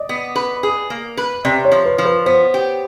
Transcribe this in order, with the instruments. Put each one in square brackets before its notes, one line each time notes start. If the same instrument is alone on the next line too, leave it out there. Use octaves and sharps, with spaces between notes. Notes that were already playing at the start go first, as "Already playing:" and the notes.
Already playing: [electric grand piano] D5 D#5
[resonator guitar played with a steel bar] B3
B4
G#4
A#3
B4
[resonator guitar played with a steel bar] C3 [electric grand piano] D5
[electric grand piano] C#5
[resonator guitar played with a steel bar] F3
[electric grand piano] B4
[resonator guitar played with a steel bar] F3
[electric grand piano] B4
[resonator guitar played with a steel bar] B3 [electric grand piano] C5
[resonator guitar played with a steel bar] G4